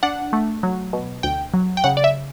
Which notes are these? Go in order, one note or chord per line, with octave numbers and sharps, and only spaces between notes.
D4 F#5
A3
F#3
B2
D2 G5
F#3
G5
C#3 F#5
D5
E5